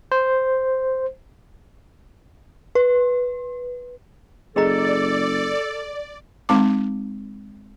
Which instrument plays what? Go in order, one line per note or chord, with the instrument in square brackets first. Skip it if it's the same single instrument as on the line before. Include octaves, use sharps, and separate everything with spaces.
[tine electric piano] C5
[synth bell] B4
[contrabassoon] F#1 [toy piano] G#4 D#5 A#5 [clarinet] A4 [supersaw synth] D5
[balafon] G#3 C4 D#4 D6